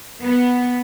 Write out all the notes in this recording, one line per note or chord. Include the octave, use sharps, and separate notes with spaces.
B3